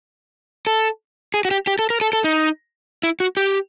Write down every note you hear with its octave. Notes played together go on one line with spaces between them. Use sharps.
A4
G#4
F#4
G4
G4
A4
A#4
A4
A4
D#4
E4
F#4
G4